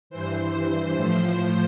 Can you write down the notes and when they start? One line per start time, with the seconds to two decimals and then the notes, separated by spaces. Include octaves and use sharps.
0.10 G2 E3 C5
0.52 C5
0.94 A2 F3